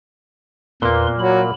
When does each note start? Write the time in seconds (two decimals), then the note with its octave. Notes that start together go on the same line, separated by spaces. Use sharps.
0.82 E2 A#2 A#3 B4 C6
1.19 F#3 B5